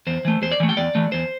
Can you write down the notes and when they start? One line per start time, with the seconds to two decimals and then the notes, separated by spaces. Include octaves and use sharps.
0.07 E2 C5
0.25 E3 A3
0.42 E2 C5
0.52 D5
0.60 E3 A3
0.69 G5
0.77 E2 D5
0.95 E3 A3
1.12 E2 C5